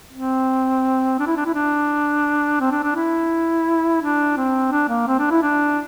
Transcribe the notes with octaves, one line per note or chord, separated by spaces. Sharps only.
C4
D4
E4
D4
E4
D4
C4
D4
D4
E4
D4
C4
D4
A#3
C4
D4
E4
D4